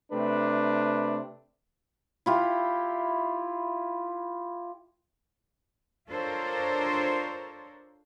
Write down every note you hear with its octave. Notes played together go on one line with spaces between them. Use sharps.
C3 A3 D4 B4
E4 F4 G4
D4 F4 A4 A#4 C5 C#5